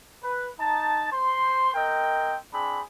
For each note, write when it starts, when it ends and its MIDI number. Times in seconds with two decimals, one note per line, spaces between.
0.22 0.48 71
0.59 1.12 63
0.59 1.12 81
1.12 1.73 72
1.12 1.73 84
1.74 2.36 60
1.74 2.36 70
1.74 2.36 75
1.74 2.36 79
2.53 2.80 60
2.53 2.80 62
2.53 2.80 68
2.53 2.80 83